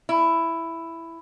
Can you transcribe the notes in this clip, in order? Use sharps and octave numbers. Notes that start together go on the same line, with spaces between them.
E4